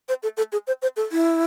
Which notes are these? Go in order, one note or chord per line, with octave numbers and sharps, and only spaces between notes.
C5
A4
A4
G#4
C5
C5
A4
E4